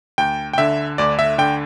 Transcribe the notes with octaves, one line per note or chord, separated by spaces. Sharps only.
D2 G5
G5
D3 E5
D2 D5
E5
D3 G5